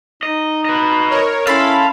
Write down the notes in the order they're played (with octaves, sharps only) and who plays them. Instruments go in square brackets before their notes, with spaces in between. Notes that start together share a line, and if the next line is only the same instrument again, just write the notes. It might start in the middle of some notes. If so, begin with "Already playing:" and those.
[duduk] D#4 [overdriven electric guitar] D#5
[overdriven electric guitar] B4 D#5
[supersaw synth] A#4 C#5
[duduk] C#4 [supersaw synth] E4 B5 [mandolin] A4 C6 [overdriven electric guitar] F5